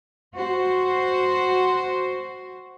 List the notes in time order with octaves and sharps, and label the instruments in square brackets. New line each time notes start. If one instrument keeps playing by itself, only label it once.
[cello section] F#4 C5